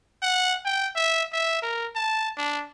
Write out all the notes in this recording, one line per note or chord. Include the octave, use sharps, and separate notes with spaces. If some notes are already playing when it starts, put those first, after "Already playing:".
F#5
G5
E5
E5
A#4
A5
D4